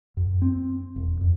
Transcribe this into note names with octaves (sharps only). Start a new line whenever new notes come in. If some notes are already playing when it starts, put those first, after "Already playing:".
F#2
C4
E1
F2